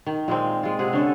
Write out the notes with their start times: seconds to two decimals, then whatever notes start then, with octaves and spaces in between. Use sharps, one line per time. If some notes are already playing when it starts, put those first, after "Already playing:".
0.06 D#3
0.28 A#2 G#3 A#3 C4
0.63 G#3 F4
0.79 C3 G#4 F#5
0.93 D3 C#4 A4